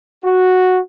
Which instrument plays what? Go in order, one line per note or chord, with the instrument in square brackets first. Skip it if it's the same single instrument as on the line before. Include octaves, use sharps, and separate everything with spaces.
[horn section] F#4